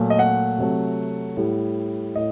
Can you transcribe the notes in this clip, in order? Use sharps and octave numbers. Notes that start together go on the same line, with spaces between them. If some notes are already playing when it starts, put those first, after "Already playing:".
Already playing: A#2 F#3 A3
D#5
F#5
C3 F#3 A3
A2 G3
A2 D#5